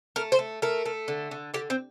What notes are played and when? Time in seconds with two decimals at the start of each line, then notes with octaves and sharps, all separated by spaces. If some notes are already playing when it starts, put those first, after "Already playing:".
0.16 A3 A#4
0.32 C5
0.39 A3
0.62 A3 A#4
0.86 A3
1.08 D3
1.31 D3
1.54 D3 G4
1.70 C4